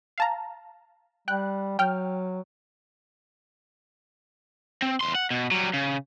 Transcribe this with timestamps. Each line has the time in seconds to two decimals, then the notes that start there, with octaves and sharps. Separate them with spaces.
0.18 F5 A5 A#5
1.28 G3 G5 F#6
1.79 F#3 G5 F6
4.82 C4
5.01 E2 C6
5.15 F#5
5.31 B2
5.51 F#3 G3
5.73 C#3